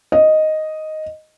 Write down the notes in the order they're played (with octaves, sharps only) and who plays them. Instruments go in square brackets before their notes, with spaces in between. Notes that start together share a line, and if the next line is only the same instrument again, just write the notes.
[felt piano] D#5